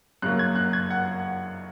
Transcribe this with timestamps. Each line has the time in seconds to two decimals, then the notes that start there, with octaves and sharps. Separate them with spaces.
0.22 F#2 C#3 F#3 A#3 F#6
0.39 G#6
0.55 F#6
0.73 G#6
0.90 F#5